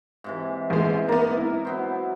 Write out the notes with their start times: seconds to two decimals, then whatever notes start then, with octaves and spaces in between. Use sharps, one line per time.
0.24 G#2 C3 E3
0.70 A1 G#3
1.08 A#3 B3 A#4 D5 A#5
1.37 E4
1.65 F#3 B3 C5